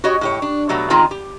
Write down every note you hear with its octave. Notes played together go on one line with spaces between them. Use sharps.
F#4 G4 C#5 D#5
A2 G4 C#5
D4
B2 F#3 G3 A3
D#3 G#3 C4 F4 A5 A#5
G4